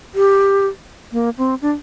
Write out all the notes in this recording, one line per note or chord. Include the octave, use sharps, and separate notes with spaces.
G4
A#3
C4
D4